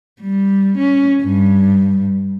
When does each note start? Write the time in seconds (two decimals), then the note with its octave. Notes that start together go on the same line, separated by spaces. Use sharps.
0.21 G3
0.77 C#4
1.23 G2